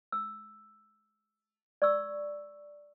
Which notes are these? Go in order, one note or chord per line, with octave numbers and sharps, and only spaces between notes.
E6
D5 C#6 E6